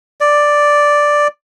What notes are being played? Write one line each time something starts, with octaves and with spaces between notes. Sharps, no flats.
D5